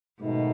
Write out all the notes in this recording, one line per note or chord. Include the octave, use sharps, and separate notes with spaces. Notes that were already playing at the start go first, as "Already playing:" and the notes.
G#2 B2 D#3 F#3 A3 D#4